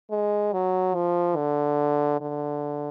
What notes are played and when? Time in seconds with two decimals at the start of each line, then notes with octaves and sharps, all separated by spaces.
0.11 G#3
0.53 F#3
0.95 F3
1.36 D3
2.21 D3